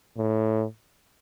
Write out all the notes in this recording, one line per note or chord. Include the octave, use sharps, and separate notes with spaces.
A2